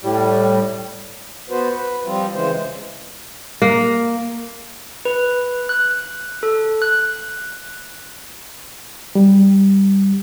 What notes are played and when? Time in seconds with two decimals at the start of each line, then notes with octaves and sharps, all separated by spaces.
0.03 A2 G3
1.49 B3 F#4 B4 C5
1.72 B4
2.04 F3 G3 C4 F4
2.32 C#3 E3 G#3 C5
3.62 A#3
5.05 B4
5.69 F#6
6.43 A4
6.82 F#6
9.15 G3